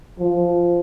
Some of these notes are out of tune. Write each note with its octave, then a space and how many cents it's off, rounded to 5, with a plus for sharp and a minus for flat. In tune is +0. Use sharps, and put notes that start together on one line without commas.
F3 -5